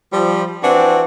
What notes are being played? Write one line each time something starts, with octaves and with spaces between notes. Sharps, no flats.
F3 G3
E3 C4 D4 F#4